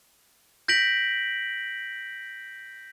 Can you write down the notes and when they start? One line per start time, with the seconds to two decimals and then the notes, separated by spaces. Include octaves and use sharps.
0.68 G6 A#6 B6 D7 F#7